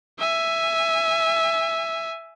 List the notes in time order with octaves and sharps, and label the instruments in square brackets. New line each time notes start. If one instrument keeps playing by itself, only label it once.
[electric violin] E5 G#5